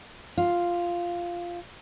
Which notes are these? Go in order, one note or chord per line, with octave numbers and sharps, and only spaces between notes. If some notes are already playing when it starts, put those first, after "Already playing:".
F4